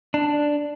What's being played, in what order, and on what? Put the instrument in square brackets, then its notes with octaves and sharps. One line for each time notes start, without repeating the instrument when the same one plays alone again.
[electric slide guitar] D4